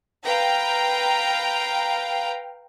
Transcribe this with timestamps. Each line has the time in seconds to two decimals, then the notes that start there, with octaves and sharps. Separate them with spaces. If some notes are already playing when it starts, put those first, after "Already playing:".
0.25 B4 F5 G5 A#5